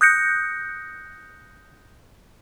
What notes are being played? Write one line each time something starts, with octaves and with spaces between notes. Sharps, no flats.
D#6 F#6 G6 A#6 C#7